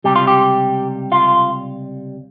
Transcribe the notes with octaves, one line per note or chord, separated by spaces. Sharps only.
C#2 C3 G3 G4
F4
G4
F4